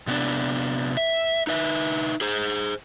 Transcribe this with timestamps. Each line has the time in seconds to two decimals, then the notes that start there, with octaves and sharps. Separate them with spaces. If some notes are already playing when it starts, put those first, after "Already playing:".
0.07 C3 B3 D4
0.97 E5
1.47 D#4 B4 E5
2.21 G#4 C5